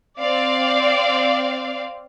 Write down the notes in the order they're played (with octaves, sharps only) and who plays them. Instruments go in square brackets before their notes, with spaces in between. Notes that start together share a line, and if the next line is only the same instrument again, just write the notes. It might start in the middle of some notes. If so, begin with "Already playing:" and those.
[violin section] C4 D5 F5